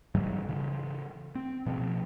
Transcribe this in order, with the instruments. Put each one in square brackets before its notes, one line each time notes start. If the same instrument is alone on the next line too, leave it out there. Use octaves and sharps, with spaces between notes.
[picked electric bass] G#2 E3 F#3 G3
C#3 E3
C4
B2 F3